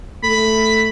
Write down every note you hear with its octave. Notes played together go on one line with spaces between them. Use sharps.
A3 B5